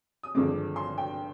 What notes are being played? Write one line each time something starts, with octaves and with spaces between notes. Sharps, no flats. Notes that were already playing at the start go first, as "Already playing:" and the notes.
D#6
G#1 G2 D3 F3 G#3 D6
C6
G5